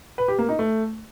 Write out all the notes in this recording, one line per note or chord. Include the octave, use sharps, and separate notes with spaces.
B4
G4
A#3
D#4
A3